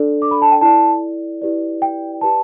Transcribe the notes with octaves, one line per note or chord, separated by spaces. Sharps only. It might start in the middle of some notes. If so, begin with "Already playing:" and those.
Already playing: D4 A4 D5
D6
B5
A5
G5
E4 A4 D5 A5
E4 G4 B4 D5
G5
G4 B4 D5 A5